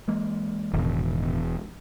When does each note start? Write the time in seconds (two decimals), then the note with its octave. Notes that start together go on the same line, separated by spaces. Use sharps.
0.08 E3 G#3 A#3
0.73 E1 E2 A2 C3 D#3